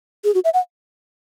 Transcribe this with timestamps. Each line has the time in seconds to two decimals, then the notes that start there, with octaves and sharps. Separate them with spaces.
0.24 G#4
0.35 F#4
0.45 E5
0.54 F#5